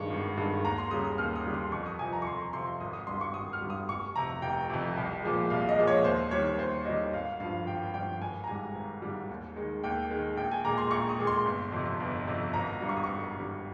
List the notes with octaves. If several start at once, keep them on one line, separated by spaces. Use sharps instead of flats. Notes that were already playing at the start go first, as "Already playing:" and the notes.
Already playing: G2 D#3 G#3 C#6
G#1
G2 D#3 G#3
D#2 A#5
C6
C#3 G3 D#6
D#6
D#2 F6
D#6
C#3 G3
C6
F2 C#6
D#6
C3 F3 G#5
A#5
C#6
F2 C6
C3 F3 C6
G#1 D#6
D#6
G2 G3 C6
C#6
G#1 D#6
F6
G2 G3
D#6
F1 C#6
F2 C3 A#5
F1 G5
F2 C3
C2
A#2 F3 G#3
C2 F5
D#5
A#2 F3 G#3
C#5
D#2 C5
D#3 G3 C#5
D#2 C5
D#3 G3 D#5
G#1 F5
G2 F3 F5
G#1 G5
G2 F3 G5
G#1 G#5
A#5
G#2 G3 G#5
G#1
G#2 G3
D#2
D#3 G#3
D#2 G5
D#3 G#3
A#1 G5
G#5
A#2 G#3 A#5
C6
A#1 C#6
D#6
A#2 G#3
C6
G1
F2 C3
G1
F2 C3
G#1 A#5
G2 G3
C#6
D#6
G#1 C#6
G2 G3